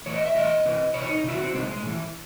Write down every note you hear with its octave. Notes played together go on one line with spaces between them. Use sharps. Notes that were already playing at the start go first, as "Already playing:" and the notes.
A2 E3 C#5
D#5
E5
A2 E3 D#5
C3 E3
C3 E3 C#5
D#4
C3 D#3 E4
F#4
C4
C3 D#3 G#3
G#3
A2 E3